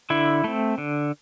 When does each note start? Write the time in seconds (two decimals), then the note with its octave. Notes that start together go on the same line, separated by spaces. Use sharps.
0.10 D3 E4
0.44 A3 C4
0.78 D3